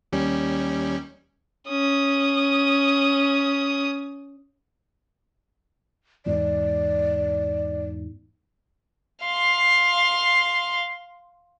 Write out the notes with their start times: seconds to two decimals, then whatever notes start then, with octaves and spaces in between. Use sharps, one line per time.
0.12 D#2 G3 C#4
1.68 C#4 D#6
6.26 E2 G#2 D5
9.26 F5 C6